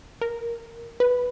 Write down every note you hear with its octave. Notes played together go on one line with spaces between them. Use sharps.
A#4
B4